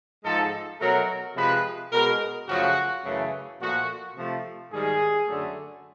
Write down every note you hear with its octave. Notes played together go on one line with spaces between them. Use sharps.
G#2 F3 G#3 A4
B2 F#3 A3 A#4
C3 F3 G#3 B4
B2 G#3 A#4
F#2 C#3 F3 A3 F#4
F#2 C#3 E3 A3
A#2 F3 A3 F#4
C3 F3 A3
G#2 D#3 G3 G#4
F#2 D3 F#3 A3